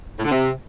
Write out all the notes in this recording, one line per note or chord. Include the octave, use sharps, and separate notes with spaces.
A2
D3
C3